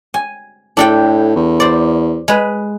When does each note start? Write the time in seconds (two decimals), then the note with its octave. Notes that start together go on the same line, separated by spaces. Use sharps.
0.14 G#5
0.77 A2 D4 A4 G5
1.36 E2
1.60 C5 D5
2.28 G#3 B4